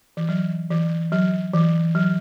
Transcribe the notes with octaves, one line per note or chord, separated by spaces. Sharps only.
E3
F#3
E3
F#3
E3
F#3